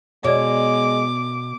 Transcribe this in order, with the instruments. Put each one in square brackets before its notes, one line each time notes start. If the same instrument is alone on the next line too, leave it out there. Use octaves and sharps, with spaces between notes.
[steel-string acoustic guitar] B2 [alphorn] G#3 [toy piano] C#5 D5 [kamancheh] D6